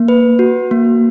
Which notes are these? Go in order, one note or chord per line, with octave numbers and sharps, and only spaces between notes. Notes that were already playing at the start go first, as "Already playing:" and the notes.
Already playing: A#3
B4
F#4
A#3